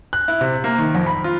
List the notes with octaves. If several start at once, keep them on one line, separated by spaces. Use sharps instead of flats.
F#6
E4
C3
A#3
D#3
F2
B5
F4